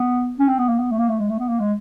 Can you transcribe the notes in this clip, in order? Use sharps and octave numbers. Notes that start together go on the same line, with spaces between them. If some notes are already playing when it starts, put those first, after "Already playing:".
Already playing: B3
C#4
C4
B3
A#3
B3
A3
A#3
A3
G#3
A3
B3
A#3
G#3